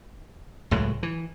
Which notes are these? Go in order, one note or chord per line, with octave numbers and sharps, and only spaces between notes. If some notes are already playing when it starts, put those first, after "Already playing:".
C#2 A2 F#3 G#3
E3